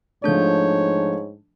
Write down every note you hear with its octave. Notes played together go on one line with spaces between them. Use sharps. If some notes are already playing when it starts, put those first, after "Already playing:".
G#2 F3 A3 D4 C#5 G6